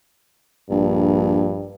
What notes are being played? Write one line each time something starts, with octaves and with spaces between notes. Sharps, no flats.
A#1 G2